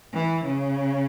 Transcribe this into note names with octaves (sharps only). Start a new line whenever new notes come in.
E3
C#3